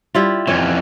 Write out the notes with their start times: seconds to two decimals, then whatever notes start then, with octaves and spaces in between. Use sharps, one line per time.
0.15 G3 E4 F4
0.47 F2 E3 C#4 C#5